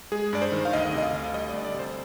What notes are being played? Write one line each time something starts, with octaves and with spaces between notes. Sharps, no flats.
G#3 G#4
G2 D5
C5
D#3
F5
D2 D#5
C3
D#5
F5
D2
G3 D#5
D2 D5
D5
C3 C5